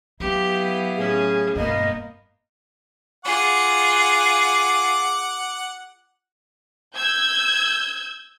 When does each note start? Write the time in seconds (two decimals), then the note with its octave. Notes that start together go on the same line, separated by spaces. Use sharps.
0.20 F#3 B3 E4 G4 F5
0.96 A2 C#4 G#4
1.56 E1 G2 A#3 B3 D#5
3.25 F4 G#4 F#5 D6
6.96 E6 G6 G#6